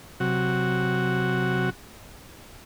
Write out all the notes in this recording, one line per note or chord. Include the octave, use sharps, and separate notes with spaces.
C3 F#3 F#4